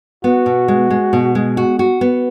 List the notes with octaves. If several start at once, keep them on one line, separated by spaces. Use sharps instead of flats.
B3 F#4
B2
G#3
G#3
B2
G#3
F#4
F#4
B3